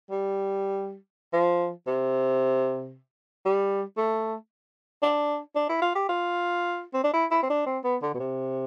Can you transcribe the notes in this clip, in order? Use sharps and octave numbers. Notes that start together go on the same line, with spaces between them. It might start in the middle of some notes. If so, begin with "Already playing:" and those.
G3
F3
C3
G3
A3
D4
D4
E4
F4
G4
F4
C4
D4
E4
E4
C4
D4
C4
B3
D3
B2
C3